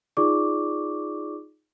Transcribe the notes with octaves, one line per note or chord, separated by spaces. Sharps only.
D#4 F4 G#4 D5 C#6 D6